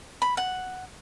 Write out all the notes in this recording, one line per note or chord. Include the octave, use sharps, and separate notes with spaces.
B5
F#5